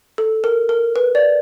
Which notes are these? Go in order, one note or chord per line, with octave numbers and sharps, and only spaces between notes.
A4
A#4
A#4
B4
D5